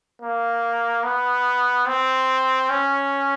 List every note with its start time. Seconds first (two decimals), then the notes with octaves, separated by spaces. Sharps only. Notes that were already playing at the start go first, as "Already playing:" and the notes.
0.22 A#3
1.04 B3
1.87 C4
2.70 C#4